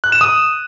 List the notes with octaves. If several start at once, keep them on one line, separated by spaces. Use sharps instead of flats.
F#6
E7
D#6